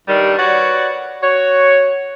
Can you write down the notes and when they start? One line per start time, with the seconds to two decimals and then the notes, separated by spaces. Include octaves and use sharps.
0.07 G2 D#3 G3
0.38 F#4 B4 C#5 D5
1.22 F#4 C#5